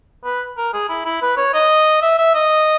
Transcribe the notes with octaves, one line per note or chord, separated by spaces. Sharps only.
B4
A#4
G#4
E4
E4
B4
C#5
D#5
E5
E5
D#5